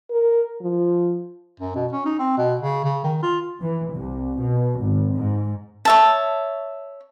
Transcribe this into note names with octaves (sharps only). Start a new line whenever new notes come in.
A#4
F3
F#2
B2
C#4
D#4
C4
B2
C#3
C#3
D#3
F4
E3
C2
B2
G#1
G#2
C#5 E5 A5